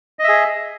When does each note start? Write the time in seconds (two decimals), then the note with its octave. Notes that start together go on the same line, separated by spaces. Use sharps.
0.19 D#5
0.24 E5
0.29 G#4